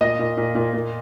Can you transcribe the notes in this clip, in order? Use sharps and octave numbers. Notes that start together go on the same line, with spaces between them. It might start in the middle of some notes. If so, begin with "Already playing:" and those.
A#2 D#5
A#2
A#2
A#2
A#2